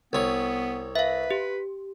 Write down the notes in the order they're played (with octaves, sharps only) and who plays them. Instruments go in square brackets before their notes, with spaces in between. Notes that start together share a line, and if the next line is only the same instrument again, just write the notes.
[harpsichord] C2 C#5 [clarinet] B3
[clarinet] B4 [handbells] E5 F5
[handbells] G4